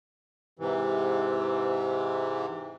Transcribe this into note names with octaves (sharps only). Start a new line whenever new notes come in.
G#2 C3 E3